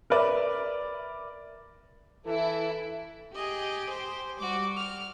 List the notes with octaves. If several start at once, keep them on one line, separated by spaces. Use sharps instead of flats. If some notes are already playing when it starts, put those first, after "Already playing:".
A#4 B4 D5 E5
E3 E4 A4
G4 G#4 D#5
C5
G3 F#4 D6
F6